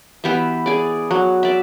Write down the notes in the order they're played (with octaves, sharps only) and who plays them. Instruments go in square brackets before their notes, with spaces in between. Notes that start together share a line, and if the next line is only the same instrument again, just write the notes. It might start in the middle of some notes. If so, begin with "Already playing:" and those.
[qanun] E3 B3 G4 E5
G#4 D5
F#3
D5 E5